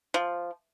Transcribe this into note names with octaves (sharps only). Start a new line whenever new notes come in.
F3